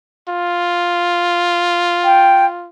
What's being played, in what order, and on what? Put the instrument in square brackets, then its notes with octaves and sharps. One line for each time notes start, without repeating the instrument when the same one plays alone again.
[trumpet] F4
[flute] G5